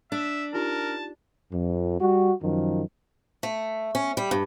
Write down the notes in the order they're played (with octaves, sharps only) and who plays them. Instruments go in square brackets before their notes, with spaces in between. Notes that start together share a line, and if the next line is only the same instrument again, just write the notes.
[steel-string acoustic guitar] D4 [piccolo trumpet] E5
[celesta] D#4 F4 G4 [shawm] A#4 [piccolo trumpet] A5
[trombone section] F2
G3 F#4
F#2 D#3 F3
[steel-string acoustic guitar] A3
C#4
G3
G2